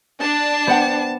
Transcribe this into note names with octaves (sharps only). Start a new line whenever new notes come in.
D4 A5
B3 C5 F#5 G5